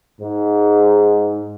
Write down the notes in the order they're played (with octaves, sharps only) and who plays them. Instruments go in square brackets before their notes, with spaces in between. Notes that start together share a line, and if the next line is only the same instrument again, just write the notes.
[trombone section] G#2